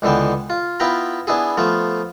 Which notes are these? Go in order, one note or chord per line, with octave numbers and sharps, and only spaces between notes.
C#2 D3 E3 B3 G5
F4
B3 E4 F4 G5 A#5 B5
B3 D4 E4 G#4
F3 A3 B3 F4